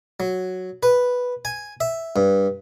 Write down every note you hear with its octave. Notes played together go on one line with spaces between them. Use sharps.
F#3
B4
G#5
E5
G2